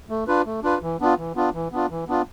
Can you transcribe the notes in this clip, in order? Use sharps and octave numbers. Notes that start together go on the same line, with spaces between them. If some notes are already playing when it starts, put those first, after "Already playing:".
A3
D4 F4 B4
A3
D4 F4 B4
E3
B3 D4 F4
E3
B3 D4 F4
E3
B3 D4 F4
E3
B3 D4 F4